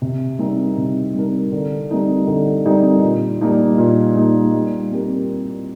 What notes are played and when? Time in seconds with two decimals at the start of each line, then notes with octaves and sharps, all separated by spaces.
0.02 C3
0.39 G3 C4 D#4 A#4
0.77 C3
1.14 G3 C4 D#4 A#4
1.52 D3
1.90 G3 C4 D#4 A#4
2.28 D3
2.66 G3 C4 D#4 A#4
3.03 A#2
3.41 G3 A#3 D#4
3.78 A#2
4.16 G3 A#3 D#4
4.54 G3
4.92 C4 G4 A#4